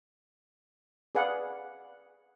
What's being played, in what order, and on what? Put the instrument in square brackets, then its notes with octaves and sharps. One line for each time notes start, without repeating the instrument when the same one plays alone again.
[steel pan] G#4 B4 D5 F5 F#5 G#5